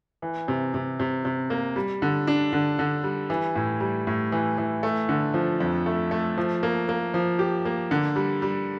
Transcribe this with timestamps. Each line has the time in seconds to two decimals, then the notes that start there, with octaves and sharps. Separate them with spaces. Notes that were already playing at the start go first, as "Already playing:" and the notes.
0.22 E3
0.48 C3
0.74 C3
1.00 C3
1.25 C3
1.50 A#3
1.76 G3
2.02 D3
2.27 D4
2.53 D3
2.79 D3
3.03 G3
3.30 E3
3.56 A2
3.80 G3
4.07 A2
4.32 E3
4.58 E3
4.83 A3
5.09 D3
5.34 F3
5.60 F2
5.86 A3
6.11 A3
6.38 F3
6.63 A#3
6.89 A#3
7.14 F3
7.39 G4
7.65 A#3
7.91 D3
8.16 G3
8.42 G3